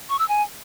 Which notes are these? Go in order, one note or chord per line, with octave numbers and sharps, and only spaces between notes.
C#6
E6
G#5